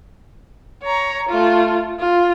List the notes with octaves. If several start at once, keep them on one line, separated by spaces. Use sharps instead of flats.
C#5 A#5
A3 F4
F4